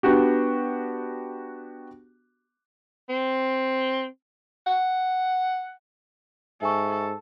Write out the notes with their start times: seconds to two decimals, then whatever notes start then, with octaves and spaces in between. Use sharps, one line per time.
0.03 B3 D4 F#4 G4
3.09 C4
4.67 F#5
6.62 G#2 A4 E5 G#5 C#6